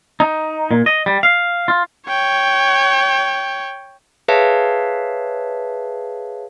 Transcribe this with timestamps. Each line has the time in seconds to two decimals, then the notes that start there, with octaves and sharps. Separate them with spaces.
0.20 D#4
0.71 A#2
0.86 D#5
1.06 G3
1.23 F5
1.68 F4
2.07 C#5 G5
4.28 G#4 B4 C#5 E5 F5 A5